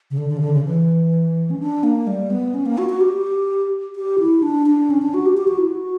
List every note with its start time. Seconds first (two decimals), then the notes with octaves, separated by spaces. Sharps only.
0.11 C#3
0.18 D3
0.30 D3
0.37 C#3
0.41 D3
0.53 C#3
0.65 E3
1.50 C#4
1.60 D4
1.83 A#3
2.07 G3
2.31 B3
2.54 C#4
2.66 A#3
2.78 F#4
2.89 F#4
3.01 G4
3.96 G4
4.19 E4
4.43 D4
4.67 D4
4.90 C#4
5.02 D4
5.14 F#4
5.26 G4
5.37 G4
5.48 F#4
5.58 E4
5.67 F#4